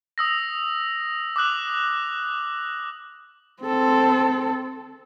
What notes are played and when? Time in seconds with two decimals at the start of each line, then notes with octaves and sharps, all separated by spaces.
0.18 D#6 E6 A#6
1.36 D6 D#6 F#6 F#7
3.63 C4 A4